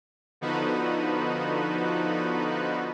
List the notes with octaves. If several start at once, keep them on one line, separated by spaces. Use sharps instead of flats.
D3 F3 B3 D#4 F#4 B4